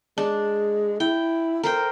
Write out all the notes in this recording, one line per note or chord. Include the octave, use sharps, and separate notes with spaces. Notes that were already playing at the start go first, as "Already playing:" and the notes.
G#3 D4
E4 G5
A4 A#4 C5 G5